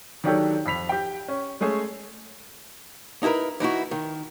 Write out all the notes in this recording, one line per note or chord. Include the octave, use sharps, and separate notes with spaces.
D#3 F#3 D4 G4 A4 C#5
F2 B5 B6 F7
G4 G5
C#4
G#3 A3 C#4 G#4
D#4 E4 G4 A#4 B4
E3 D#4 E4 F#4
D#3